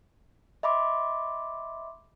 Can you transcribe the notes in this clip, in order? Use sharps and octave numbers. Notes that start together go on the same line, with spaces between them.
D#5 E5 B5 C6 D6